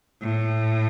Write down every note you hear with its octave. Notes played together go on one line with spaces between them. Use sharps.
A2